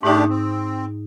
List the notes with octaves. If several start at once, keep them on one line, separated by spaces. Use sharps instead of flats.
G#2 A3 D4 D#4 G4
C4